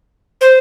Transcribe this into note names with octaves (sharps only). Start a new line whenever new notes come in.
C5